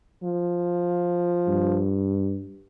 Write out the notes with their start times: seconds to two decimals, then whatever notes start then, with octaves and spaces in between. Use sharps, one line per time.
0.23 F3
1.48 G2